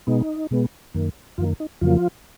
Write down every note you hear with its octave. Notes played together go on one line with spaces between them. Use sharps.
B2 G#3 B3 D#4
B2 G#3 B3
F#2 D#3 A#3
F#2 D#3 F3 A#3 F4
D#4
F2 C#3 F3 F#3 A#3 F4